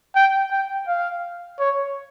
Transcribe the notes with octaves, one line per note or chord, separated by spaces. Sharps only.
G5
G5
F5
C#5